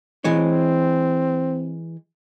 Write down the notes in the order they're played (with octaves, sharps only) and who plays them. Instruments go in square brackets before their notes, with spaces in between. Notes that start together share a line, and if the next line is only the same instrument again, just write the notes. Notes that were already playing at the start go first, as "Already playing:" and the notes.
[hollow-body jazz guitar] E3 G#3 C#5 [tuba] C4